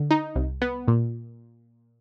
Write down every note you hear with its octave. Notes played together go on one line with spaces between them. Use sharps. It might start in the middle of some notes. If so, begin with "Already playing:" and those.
Already playing: D3
D#4
C2
B3
A#2